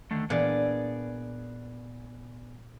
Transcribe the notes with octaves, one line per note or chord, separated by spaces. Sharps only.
D3 D#3 A3
A#2 E3 B3 D4 G#4 D5